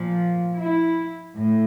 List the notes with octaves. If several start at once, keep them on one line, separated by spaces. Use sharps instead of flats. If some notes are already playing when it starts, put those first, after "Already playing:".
Already playing: A#2 F3
E4
A2